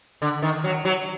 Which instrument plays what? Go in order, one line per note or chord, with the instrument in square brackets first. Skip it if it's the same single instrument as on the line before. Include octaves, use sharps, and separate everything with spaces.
[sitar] D3
D#3
F#3
F#3